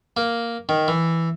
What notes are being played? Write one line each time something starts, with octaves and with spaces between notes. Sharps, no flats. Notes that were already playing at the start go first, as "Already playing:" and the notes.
A#3
D#3
E3